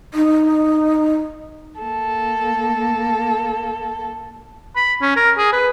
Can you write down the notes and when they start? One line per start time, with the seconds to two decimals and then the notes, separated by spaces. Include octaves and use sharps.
0.14 D#4
1.80 A#3 A4
4.76 B5
5.01 C#4
5.16 A#4
5.37 G#4
5.52 B4